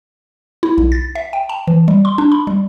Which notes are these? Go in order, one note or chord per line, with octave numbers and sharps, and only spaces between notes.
E4
B1
A6
E5
G5
A5
E3
G3
C6
D4
B5
G3